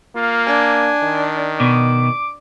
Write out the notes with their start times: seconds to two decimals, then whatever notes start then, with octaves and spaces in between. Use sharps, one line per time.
0.16 A#3 F4
0.46 D4 G#5
1.03 D#3
1.60 B2 D6